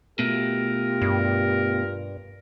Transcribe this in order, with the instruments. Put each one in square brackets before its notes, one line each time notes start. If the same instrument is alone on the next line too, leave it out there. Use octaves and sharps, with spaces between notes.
[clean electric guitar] B2 A3 [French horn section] F4 G4 [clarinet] A#4
[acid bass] G2